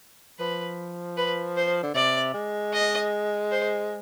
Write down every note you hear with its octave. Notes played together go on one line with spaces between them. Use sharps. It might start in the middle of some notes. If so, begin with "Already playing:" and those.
F3 B4
B4
C5
D3
C3 D5
G#3
D#5
C5